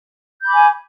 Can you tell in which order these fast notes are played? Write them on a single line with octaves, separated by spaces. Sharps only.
G6 B5 D6 G#5